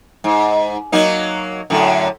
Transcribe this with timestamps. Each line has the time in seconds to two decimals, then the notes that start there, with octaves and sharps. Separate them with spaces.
0.24 G#2
0.92 F#3 A#3 D#4
1.70 F#2 A2 D3